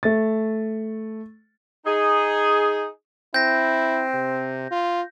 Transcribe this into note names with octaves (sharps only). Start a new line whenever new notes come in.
A3 A6
D#4 G#4
C4 E4 G6 A#6
C3
F4